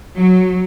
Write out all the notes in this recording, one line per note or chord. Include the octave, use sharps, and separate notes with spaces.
F#3